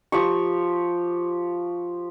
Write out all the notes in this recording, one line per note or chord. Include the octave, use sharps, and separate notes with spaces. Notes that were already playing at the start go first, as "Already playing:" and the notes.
F3 G4 C#6